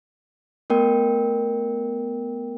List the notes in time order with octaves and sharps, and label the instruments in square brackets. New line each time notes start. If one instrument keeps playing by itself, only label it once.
[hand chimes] A3 B3 A#4 G5